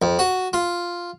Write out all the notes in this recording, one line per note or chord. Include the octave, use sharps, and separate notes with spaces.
F2
F#4
F4